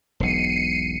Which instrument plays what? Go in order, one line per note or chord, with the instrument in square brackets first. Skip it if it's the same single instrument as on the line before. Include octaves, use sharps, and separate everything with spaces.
[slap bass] E1 B1 [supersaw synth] C7 C#7 D#7